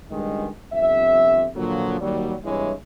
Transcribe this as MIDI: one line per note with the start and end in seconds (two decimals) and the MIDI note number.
0.11 0.48 37
0.11 0.48 43
0.11 0.48 51
0.11 0.48 56
0.73 1.48 31
0.73 1.48 41
0.73 1.48 48
0.73 1.48 76
1.56 1.99 46
1.56 1.99 50
1.56 1.99 53
1.56 1.99 54
2.01 2.35 39
2.01 2.35 54
2.01 2.35 55
2.44 2.73 36
2.44 2.73 43
2.44 2.73 52
2.44 2.73 56
2.44 2.73 64
2.44 2.73 73